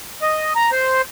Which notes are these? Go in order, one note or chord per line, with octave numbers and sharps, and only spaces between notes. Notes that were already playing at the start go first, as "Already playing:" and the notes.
D#5
A#5
C5